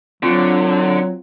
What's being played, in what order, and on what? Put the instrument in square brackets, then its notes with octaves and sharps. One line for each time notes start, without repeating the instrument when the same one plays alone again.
[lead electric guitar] D3 [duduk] F#3 [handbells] C4 F4